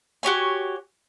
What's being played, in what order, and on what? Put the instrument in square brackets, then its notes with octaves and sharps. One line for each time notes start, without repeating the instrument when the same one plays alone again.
[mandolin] F#4 G4 C#5 G#5